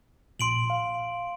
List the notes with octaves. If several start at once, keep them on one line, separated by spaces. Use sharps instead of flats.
A#1 A#2 C6 D7 F#7
F5